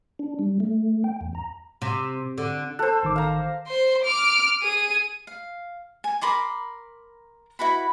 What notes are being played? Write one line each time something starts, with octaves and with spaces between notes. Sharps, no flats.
D4
G3
A3
G5
E2
A#5
C3
D3
A4 C5 F#6
A1 D#3 D6
F5 A#5
C5 C6
D6 F6
G#4 D#7
F5
G#5
A#4 B5 C6 D6
E4 F#4 B4 B5